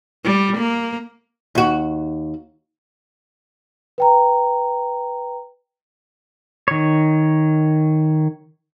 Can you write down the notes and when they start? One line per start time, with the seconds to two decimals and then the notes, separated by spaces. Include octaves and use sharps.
0.24 G3
0.57 A#3
1.55 D#2 F#4
3.98 B4 G5 A#5
6.68 D#3 C#5